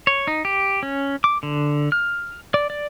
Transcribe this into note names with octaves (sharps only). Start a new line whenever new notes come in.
C#5
D#4
G4
C#4
D6
D3
F6
D5
D5